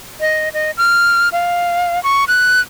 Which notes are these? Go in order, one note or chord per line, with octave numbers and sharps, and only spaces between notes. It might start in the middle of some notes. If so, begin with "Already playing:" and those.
D#5
D#5
F6
F5
C#6
F#6